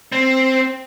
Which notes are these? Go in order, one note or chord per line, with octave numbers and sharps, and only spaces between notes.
C4